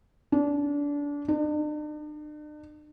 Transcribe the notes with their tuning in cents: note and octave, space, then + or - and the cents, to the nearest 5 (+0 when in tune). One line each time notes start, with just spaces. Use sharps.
D4 -25
D4 +45